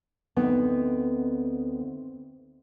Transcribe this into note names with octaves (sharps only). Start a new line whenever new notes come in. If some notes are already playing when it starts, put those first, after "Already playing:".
D2 B3 C4 D#4